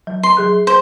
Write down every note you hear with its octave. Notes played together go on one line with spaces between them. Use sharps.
F#3
C6
F#3 G#4 F#6
C5